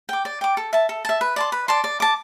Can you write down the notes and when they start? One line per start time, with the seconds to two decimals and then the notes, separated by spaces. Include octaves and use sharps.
0.09 G5 D6
0.25 D5
0.41 G5 D6
0.57 A4
0.73 E5 A5
0.89 A4
1.05 E5 A5
1.21 B4
1.36 D5 A5 C6
1.52 B4
1.68 D5 A5 C6
1.84 D5
2.00 A5 D6